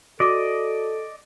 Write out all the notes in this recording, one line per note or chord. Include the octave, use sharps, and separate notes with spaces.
F#4 A4 D5 D#5 D6